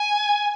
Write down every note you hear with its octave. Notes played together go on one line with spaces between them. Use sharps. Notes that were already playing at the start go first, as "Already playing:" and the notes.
Already playing: G#5